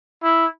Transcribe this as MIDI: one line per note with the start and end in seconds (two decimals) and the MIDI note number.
0.23 0.46 64